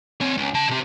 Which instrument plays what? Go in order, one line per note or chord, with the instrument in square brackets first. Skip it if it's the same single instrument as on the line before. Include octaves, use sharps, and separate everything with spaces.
[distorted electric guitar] C4 C#5
C#2
C#3 A5
C3 G4